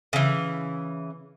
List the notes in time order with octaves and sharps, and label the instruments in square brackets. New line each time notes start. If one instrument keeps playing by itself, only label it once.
[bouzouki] C#3 E3